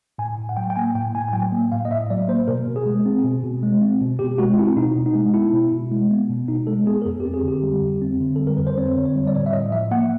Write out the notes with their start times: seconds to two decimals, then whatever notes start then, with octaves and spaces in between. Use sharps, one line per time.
0.18 A2 G#5
0.38 A2
0.49 F#5
0.57 F#3 G5
0.70 G5
0.76 A#3 G#5
0.95 A2 G5
1.15 A2 G#5
1.28 G#5
1.33 F#3 G5
1.52 A#3
1.72 A2 F5
1.85 D#5
1.90 A2 E5
2.10 F#3 D5
2.28 A#3 C5
2.48 B2 A#4
2.67 B2
2.76 G#4
2.86 G#3
3.06 C4
3.24 B2
3.44 B2
3.63 G#3
3.81 C4
4.01 B2
4.19 B2 G4
4.38 G#3 F#4
4.53 F4
4.57 C4 E4
4.77 B2 D#4
4.96 B2
5.06 D#4
5.15 G#3
5.34 B3 E4
5.53 B2
5.72 B2
5.92 G#3
6.11 B3
6.30 B2
6.48 B2 D#4
6.67 G#3 A4
6.86 B3 G#4
7.02 A#4
7.05 F2 A4
7.20 G4
7.25 C4
7.34 G#4
7.43 D3 G4
7.63 G3
7.81 F2
8.02 C4
8.20 D3
8.36 G3 A4
8.47 A#4
8.57 F2 B4
8.67 C5
8.78 C4 C#5
8.96 D3
9.05 C#5
9.15 G3
9.27 D5
9.34 A2 C#5
9.46 E5
9.53 A2 D#5
9.72 F3 E5
9.91 A#3 F#5